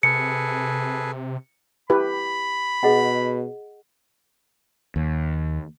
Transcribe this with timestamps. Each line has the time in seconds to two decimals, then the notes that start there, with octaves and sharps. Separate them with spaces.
0.03 C3 G#4 A4 B4 C#7
1.90 E4 G4 B4 B5
2.83 B2 G#4 D#5 F#5
4.96 D#2